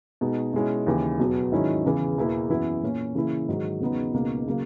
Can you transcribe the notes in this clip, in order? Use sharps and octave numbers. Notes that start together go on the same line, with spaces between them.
B2 G#3 D#4
B2 G#3 C#4 E4
D#2 C#3 E3
E2 B2 F#3
G#2 D#3 F#3 C#4 E4
E2 C#3 E3
E2 B2 A#3 E4
F#2 E3 B3 E4
A#2 A#3 C#4
C#3 E3 A#3 C#4 E4
G#2 D#3 F#3
E2 C#3 F#3 B3 D#4
C#2 B2 A#3 D#4
C#3 F#3 A#3